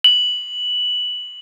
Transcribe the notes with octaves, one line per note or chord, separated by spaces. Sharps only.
F#7